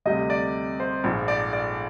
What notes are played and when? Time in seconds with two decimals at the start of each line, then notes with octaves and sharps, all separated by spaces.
0.06 D2 C3 G3 D#5
0.30 D5
0.80 C5
1.04 A#1 G#2 F3
1.28 D5
1.53 D5